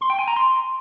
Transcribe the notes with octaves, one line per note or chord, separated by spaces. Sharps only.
C6
G5
G#5
A#5
C6